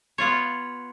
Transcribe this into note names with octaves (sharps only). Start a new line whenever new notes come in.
B3 F4 C#5